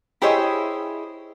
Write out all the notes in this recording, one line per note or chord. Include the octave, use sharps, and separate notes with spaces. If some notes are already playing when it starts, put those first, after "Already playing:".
E4 G4 G#4 C5 C#5 D#5